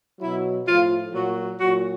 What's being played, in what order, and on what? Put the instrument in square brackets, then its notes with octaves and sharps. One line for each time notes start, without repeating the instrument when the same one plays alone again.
[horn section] B2 F#3 E4
A2 F3 F4
A#2 F#3 F#4
A#2 F#3 F#4